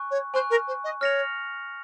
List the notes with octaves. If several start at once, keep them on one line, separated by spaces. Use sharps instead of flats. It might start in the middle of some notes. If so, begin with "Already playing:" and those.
Already playing: G#5 C#6 F#6
C#5
C5 G#5 C#6 F#6
A#4
C5
D#5
C#5 F6 A#6 C#7 F7